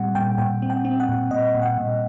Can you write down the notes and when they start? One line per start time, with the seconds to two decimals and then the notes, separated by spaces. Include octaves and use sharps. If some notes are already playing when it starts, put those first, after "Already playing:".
Already playing: A#2 G3 C4 F#5
0.15 A#2 G5
0.38 A#2 G5
0.62 C4
0.70 G5
0.85 C4
1.00 F#5
1.09 A#2
1.31 A#2 D#5
1.55 A#2
1.62 F#5
1.78 A#2